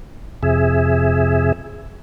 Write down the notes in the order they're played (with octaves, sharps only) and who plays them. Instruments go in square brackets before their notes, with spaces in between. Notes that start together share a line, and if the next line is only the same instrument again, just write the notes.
[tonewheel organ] F2 C3 G#4 E5